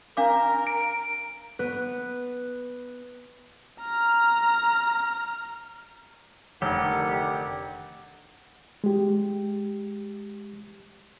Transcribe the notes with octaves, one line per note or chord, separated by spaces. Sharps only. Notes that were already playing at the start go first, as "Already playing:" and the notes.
D4 A#4 F5 D6
D7
B3 B4
A#5 F6
F1 D3 D#3 G4 F#5
G#3 G4